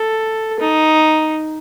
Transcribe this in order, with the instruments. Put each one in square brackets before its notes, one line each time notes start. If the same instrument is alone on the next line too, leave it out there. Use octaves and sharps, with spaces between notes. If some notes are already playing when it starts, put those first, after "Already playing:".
Already playing: [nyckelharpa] A4
D#4